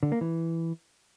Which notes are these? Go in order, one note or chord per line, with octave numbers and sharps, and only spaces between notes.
D3
A#3
E3